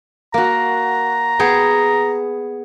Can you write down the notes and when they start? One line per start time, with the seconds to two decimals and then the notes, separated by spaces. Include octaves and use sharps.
0.34 A#3 F#4 A#5
1.39 B3 G#4 G5